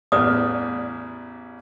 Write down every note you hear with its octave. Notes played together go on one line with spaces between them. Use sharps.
A1 E2 A2 B4 D5 D#6